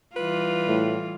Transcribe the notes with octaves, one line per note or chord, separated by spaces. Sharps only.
E3 G3 F4 B4
A2